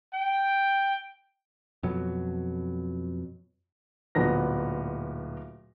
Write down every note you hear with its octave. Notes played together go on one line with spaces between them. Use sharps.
G5
F2 B2 F#3
D1 A#2 B3 A#6